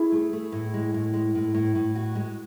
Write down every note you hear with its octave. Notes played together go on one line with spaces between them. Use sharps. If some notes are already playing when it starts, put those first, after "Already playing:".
Already playing: E4 G#4
A3
A3
A2
G#3
A2
G#3
A2
A2
A2
F#4
G#3